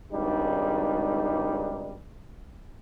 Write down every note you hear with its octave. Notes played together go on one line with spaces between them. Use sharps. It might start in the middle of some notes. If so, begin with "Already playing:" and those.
G#1 C#2 G3 D4 D#4